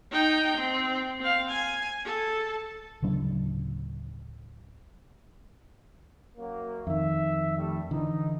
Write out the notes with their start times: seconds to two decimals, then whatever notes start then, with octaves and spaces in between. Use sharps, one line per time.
0.11 D#4 G5
0.57 C4
1.20 C4 F5
1.50 G#5
2.05 A4
3.02 D1 C#3 F#3 D4
6.37 F#2 F#3 A#3
6.87 F2 D#3 E5
7.57 G3 A3
7.91 D3 E3 D#4